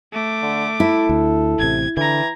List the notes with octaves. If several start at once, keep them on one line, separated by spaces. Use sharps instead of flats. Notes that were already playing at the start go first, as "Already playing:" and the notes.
A3 D6
D3
E4 A4
D2
A1 C3 G#6
D3 E3 A#5 G#6